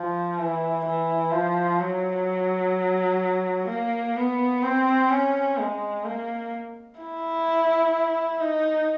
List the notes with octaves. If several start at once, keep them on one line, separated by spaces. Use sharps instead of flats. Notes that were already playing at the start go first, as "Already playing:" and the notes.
Already playing: F3
E3
E3
F3
F#3
A#3
B3
C4
C#4
G#3
A#3
E4
D#4